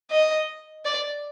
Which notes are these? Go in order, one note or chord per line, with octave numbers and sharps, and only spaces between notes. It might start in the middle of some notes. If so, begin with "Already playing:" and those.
D#5
D5